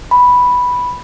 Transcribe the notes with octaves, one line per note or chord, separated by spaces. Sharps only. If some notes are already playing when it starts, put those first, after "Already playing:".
B5